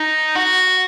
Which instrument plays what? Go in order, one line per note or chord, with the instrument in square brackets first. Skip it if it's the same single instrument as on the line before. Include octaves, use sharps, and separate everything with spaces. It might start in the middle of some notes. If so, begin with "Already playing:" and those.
Already playing: [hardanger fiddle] D#4
F#4